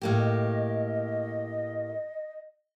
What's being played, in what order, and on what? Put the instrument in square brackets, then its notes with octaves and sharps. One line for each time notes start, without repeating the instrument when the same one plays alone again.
[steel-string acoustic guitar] A2 A#3 G4
[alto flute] D#5